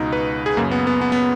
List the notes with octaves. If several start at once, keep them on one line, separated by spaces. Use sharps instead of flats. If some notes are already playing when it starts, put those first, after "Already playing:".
Already playing: C#2 B2 D#4
B4
G#4
F#2 C#3 A#3
B3
B3
B3
B3